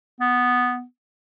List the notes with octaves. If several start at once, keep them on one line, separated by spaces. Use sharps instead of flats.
B3